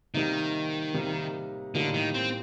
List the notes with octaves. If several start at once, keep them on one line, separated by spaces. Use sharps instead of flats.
C3 D#3 G3 A#3 D#4
C3 G3 A#3 D#4
A2 D3 G3 A#3 D#4
D#3
C4